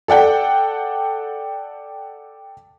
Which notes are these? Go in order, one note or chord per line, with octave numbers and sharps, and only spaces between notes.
A4 D5 F#5 G5